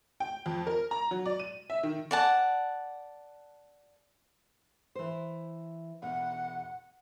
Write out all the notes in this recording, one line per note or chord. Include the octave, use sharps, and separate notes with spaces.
G5
F2
A#4
A#5
F#3
D5
D#7
E5
D#3
D5 F#5 A5
E3 C5
E2 B2 F#5